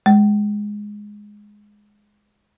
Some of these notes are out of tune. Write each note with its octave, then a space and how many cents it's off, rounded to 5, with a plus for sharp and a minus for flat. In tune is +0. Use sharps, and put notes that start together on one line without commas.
G#3 +0